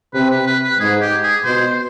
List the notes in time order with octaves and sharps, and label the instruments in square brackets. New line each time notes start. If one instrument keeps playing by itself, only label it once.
[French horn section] C3 [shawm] B4
[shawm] B4
B4
B4
[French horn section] G#2 [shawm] G#4
[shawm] G4
G#4
[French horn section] B2 [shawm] C5